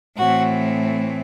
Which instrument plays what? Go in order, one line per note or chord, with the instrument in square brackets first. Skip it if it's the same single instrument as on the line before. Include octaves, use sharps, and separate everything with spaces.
[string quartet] A2 E3 A3 C4 F#4